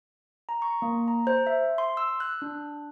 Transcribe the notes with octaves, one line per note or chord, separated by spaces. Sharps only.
A#5
C#6
A#3
A#5
C5
E5
C6
E6
F#6
D4